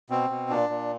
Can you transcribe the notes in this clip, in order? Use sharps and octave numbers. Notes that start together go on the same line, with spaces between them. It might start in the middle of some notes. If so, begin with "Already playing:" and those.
B2 C4
B2
A#2 D4
A#2